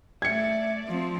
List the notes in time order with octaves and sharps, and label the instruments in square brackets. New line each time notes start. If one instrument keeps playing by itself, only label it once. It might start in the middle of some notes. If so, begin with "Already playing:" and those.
[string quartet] A3 D5 E5 [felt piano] G#6 C#7
[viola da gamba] F3 C4